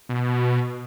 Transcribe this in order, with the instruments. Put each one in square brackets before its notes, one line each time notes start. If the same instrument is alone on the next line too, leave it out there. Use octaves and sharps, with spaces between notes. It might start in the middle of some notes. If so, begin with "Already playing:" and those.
[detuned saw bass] B2